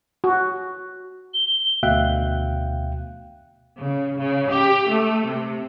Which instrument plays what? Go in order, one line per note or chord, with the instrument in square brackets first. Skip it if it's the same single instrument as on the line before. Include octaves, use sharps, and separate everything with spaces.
[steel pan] F#4
[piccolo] G7
[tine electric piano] D2 B2 E5 F5 G5 F#6
[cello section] C#3
C#3
G4
A3
C3